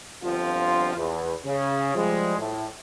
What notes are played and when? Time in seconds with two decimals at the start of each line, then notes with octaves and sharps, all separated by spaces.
0.23 G1 D3 F3 C4 F4
0.96 E2
1.45 C#3
1.95 F3 G3 G#3
2.38 A2